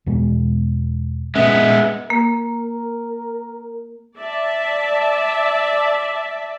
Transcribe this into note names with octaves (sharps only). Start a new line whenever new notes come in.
E2 B2 G#3
A#2 G#3 B3 C#4 E5
A#3 A#4
D5 E5 A5